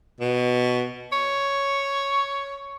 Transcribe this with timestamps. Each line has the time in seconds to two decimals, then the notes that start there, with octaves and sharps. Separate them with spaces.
0.21 B2
1.12 C#5